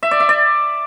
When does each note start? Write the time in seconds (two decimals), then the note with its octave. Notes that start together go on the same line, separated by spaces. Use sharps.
0.03 E5
0.11 D5
0.20 E5
0.29 D5